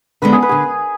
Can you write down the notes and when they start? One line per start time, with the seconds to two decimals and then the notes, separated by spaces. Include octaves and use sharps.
0.22 D3 G#3 B3 D4 B4
0.33 G#4
0.42 B4
0.49 D3 G#4